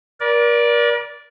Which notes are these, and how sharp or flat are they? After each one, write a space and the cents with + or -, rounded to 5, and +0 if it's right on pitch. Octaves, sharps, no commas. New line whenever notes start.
A#4 +40 D5 -10